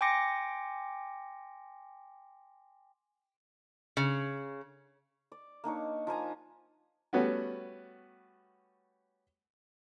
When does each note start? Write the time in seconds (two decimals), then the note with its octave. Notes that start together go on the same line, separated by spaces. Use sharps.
0.01 G5 G#5 C6 D6 A#6 C#7
3.97 C#3
5.32 D5
5.64 A#3 D4 D#4 C#5
6.07 F3 A#3 G#5 A#5
7.13 G3 A3 B3 C#4 F#4